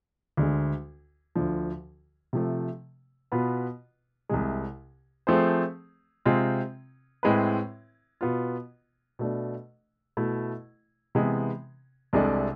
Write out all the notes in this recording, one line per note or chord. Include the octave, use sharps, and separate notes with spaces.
D2 D3 G#3
D2 D3 F3
C3 F3 A3
B2 B3 F4 B4
C2 C3 G#3
F3 A3 C4 G#4 C5
C3 G#3 C4 F4
A2 G#3 C4 E4 B4
B2 B3 F4
B2 A3 D4
B2 A3 E4
C3 E3 G#3 B3
C2 C3 G#3 D4 A4